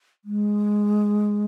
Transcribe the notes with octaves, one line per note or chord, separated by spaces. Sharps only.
G#3